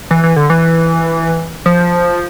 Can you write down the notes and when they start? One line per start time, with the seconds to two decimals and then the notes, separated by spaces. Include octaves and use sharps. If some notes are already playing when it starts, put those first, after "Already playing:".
0.11 E3
0.24 E3
0.36 D3
0.50 E3
1.66 F3